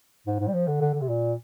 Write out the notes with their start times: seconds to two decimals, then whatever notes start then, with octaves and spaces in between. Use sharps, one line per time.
0.27 G#2
0.40 G#2
0.48 G3
0.54 F3
0.68 D3
0.81 D3
0.94 D3
1.01 C3
1.09 A#2